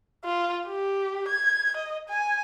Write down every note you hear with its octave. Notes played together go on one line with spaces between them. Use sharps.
F4
G4
G#6
D#5
G#5